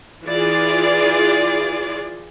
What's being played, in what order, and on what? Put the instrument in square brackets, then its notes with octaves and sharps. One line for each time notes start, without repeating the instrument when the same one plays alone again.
[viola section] E3 F4 G#4 D5